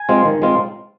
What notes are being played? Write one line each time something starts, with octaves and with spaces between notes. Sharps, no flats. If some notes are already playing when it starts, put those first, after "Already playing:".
Already playing: G#5
G#3 C4 F4
D#3
G#3 C4 F4